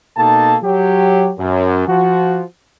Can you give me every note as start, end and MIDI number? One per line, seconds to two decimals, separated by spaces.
0.17 0.56 47
0.17 0.56 58
0.17 0.56 63
0.17 0.56 69
0.17 0.56 81
0.63 1.31 54
0.63 1.31 67
1.39 1.85 42
1.87 2.43 53
1.87 2.43 66